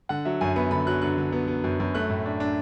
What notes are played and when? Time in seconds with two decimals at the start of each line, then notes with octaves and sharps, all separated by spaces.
0.09 D3 F#5
0.25 F#3 E5
0.41 F#2 G#5
0.56 B3 B5
0.71 D3 B5
0.87 F#3 F#6
1.02 D3 F#6
1.18 D3
1.32 B3
1.48 B3
1.64 F#2
1.80 F#2
1.95 A3 F#6
2.10 A2
2.26 D4
2.40 D4